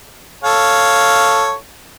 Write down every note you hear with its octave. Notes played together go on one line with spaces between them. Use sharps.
A4 C#5 F5